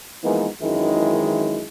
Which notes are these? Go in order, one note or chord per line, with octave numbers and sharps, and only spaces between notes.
E3 F3 G#3 A#3 B3 D#4
G#1 F#2 D#3 E3 G#3 E4